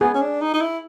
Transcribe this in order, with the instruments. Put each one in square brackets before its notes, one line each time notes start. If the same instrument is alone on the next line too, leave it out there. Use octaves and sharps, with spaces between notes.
[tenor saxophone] B3 [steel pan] G#4
[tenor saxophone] C#4
D4
D#4
D#4
E4